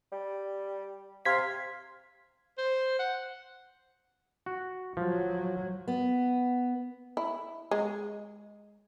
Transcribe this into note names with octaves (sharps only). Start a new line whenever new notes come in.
G3
C3 F5 C6 G#6 B6
C5
F#5
F#4
F3 F#3
B3
E4
G#3